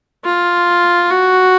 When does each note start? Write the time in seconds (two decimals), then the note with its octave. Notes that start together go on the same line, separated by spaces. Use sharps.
0.25 F4
1.11 F#4